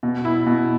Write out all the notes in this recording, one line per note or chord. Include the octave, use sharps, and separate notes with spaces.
B2
E4
B2